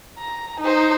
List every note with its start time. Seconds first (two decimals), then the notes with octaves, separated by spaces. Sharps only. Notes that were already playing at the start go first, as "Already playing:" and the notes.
0.18 A#5
0.61 D#4 C5